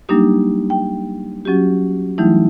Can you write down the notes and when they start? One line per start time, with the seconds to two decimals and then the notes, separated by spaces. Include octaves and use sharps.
0.09 F#3 G3 A#3 D4 D#4 G4
0.70 G5
1.45 F#3 C#4 F#4 G4
2.18 E3 F#3 G3 A3 D#4 E4